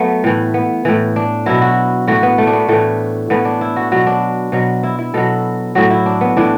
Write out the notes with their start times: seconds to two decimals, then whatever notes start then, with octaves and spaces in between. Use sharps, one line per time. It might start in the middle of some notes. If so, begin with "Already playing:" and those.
Already playing: F#3 A3 B3
0.24 A2 E3
0.54 B3
0.85 A2 E3
1.16 D4
1.46 B2 F#3 E4
1.61 F#4
2.08 A2 E3 F#4
2.23 B3
2.38 A3
2.47 D4
2.53 B3
2.69 A2 E3 A3
3.30 A2 E3 B3
3.45 D4
3.61 E4
3.76 F#4
3.92 B2 F#3 F#4
4.07 D4
4.52 B2 F#3
4.83 E4
4.99 E4
5.14 B2 F#3 A4
5.75 A2 F#3 F#4
5.90 E4
6.06 D4
6.21 B3
6.37 A2 E3 D4